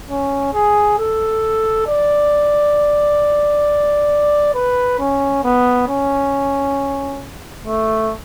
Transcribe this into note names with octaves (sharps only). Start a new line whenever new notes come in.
C#4
G#4
A4
D5
B4
C#4
B3
C#4
A3